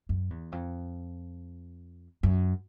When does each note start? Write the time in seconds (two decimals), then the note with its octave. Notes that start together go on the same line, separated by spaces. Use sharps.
0.09 F#2
0.30 E2
0.52 F2
2.23 F#2